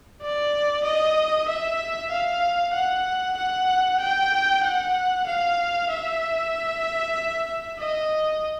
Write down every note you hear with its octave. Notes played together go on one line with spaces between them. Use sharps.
D5
D#5
E5
F5
F#5
F#5
G5
F#5
F5
E5
D#5